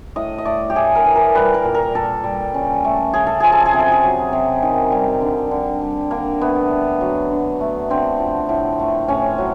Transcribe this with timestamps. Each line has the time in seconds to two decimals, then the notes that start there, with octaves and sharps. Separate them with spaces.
0.16 A2 D#5
0.38 D#5
0.45 A3 D5
0.70 G4
0.75 A2 G#4
0.95 A#4
1.05 E3
1.15 A#4
1.34 G3 B4
1.54 A#4
1.64 A#2
1.74 A#4
1.94 A#2 A4
2.24 G3
2.54 C#3
2.84 A3
3.13 C#3 G#4
3.27 A4
3.40 F3 G#4
3.52 A4
3.66 G#4
3.74 C3
3.79 A4
3.92 G#4
4.04 F#3
4.33 C3
4.62 D#3
4.92 G3
5.21 D3
5.51 D3
5.81 G3
6.11 D3 A#3
6.41 A3 B3
6.71 D3
7.01 F#3
7.31 D3
7.61 A3
7.90 D3 C4
8.20 F3
8.49 A2
8.80 A3
9.08 A2 C#4
9.38 F#3